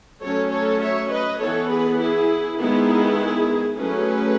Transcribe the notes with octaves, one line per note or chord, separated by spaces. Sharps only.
F#3 A3 C#4 A4 C#5
A4 C#5
C#5 E5
B4 D#5
E3 B3 A4 C#5
G#4 B4
E4 G#4
D#3 G#3 B3 E4 G#4
F#3 A3 C#4 G#4 B4